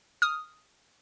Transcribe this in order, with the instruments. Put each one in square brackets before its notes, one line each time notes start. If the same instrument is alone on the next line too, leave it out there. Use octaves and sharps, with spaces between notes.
[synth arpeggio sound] D#6 F6